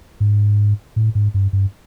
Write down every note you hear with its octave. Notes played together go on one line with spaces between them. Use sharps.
G#2
A2
G#2
G2
G2